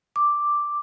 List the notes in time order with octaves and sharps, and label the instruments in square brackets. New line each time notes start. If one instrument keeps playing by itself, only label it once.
[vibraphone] D6